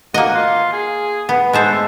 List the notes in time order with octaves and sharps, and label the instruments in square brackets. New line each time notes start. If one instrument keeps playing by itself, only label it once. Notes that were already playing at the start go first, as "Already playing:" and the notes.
[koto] A#3 D#5 [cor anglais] F#4
[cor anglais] F4
G#4
[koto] B3
[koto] G#3 A4 C5 [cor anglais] B3
[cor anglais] A3